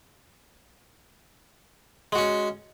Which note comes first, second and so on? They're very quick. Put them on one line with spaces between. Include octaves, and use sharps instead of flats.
G#3 F#4 C#4